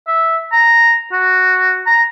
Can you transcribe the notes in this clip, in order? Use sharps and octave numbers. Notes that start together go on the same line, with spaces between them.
E5
A#5
F#4
A#5